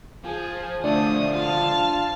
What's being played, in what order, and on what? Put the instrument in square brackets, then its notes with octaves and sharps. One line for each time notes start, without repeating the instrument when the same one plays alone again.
[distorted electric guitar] F3 [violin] G#4
[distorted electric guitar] D3 F3 [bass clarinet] A3 [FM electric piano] D4 [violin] D#6
[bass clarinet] F4 [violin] F5 A5